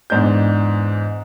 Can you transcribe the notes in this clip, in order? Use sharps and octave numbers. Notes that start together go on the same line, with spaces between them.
E2 G#2 D4 G6